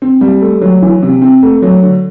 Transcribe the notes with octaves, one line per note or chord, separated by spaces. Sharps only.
C4
G3
A3
F#3
E3
C3
C4
A3
F#3
D3